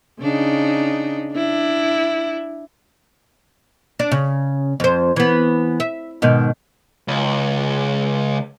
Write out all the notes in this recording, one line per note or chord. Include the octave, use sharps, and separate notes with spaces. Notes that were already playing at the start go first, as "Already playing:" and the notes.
C#3 D4 D#4
D4 E4
D4
C#3
F2 C5
E3 B3
E5
G#2 B2 D#3
C#2